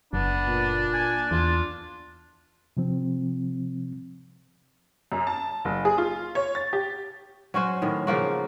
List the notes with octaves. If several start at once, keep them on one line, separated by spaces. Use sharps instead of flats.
F#1 B3 D4
A#2
G#5
E2 F4
C3 F3 C4
F#2
A5
F#1
G#4
F4
C#5
A6
G4
F#3 C#4 F#4 C5
A2 D#3
C#3 F3 A#3 F#4